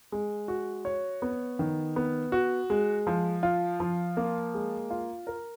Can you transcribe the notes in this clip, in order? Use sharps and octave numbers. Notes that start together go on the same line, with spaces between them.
G#3
F#4
C#5
B3
D#3
B3
F#4
G#3
F3
F4
F3
A#3
G#3
F4
A#4